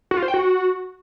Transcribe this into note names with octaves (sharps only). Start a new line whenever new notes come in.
F#4
F4
C5
G5
F#4